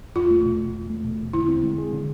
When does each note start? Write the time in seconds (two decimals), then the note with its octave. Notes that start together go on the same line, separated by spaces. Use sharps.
0.16 E2 F4
0.31 A3
0.46 B2
0.61 E2
0.75 E2
0.90 A3
1.04 B2
1.19 E2
1.33 D3 E4
1.48 C4
1.63 G#3
1.78 G#4
1.93 D3